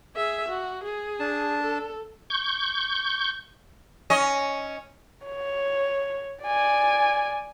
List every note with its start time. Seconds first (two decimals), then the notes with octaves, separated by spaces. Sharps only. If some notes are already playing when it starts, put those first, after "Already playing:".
0.15 G#4 E5
0.48 F#4
0.83 G#4
1.20 D4 A5
1.62 A4
2.30 C#6 G6
4.10 C#4 D#5
5.26 C#5
6.43 D5 G#5